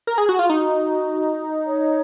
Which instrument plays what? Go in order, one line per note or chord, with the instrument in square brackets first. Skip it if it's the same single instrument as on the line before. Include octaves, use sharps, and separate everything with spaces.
[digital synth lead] A#4
G#4
F#4
F4
[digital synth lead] D#4 [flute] F#4
[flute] C#5